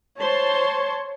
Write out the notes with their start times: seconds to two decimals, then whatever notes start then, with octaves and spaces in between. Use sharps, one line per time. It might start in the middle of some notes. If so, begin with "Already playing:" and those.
0.20 C5 C#5 A5 C6